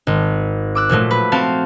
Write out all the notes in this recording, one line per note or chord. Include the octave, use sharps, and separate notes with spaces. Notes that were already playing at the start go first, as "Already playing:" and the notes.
G#1
D6 E6 F#6
A#2 F3 F#3 A3
B4
C4 F#4 F5 A5